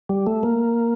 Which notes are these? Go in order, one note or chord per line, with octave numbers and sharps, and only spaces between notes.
G3
A3
A#3